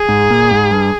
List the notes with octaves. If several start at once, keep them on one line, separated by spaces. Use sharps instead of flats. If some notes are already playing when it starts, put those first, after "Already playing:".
Already playing: G#4
G#2
A#2
G#2
G2